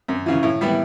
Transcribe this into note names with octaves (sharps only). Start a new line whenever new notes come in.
F#2
C#3 E3
A2
E3 G3 B3 E4